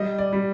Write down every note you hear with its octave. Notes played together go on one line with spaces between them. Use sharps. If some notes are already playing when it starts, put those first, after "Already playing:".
Already playing: G3 D#5
D5
G3